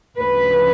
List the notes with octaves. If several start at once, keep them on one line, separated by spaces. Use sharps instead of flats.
D2 C#3 F3 B4